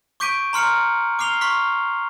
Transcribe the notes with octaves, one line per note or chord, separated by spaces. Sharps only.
C#6 D6 G6 B6 D7 D#7
A#5 C6 F6 C#7 F#7
D6 F6 C7 F7 G7
C6 C#6 F6 B6